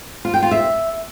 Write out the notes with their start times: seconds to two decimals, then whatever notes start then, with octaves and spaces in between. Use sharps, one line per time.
0.25 F4
0.34 G5
0.43 F4
0.51 E5